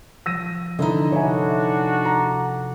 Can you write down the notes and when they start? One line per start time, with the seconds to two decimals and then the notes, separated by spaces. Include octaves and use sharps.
0.26 F3 E6 A#6 D#7
0.79 D3 E3 D#4 E4 D#5
1.12 C3 A3 D4 F#4 C#5 E5 G#5
2.05 A#5